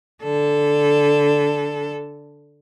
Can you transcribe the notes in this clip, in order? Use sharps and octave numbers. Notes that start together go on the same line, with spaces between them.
D3 A4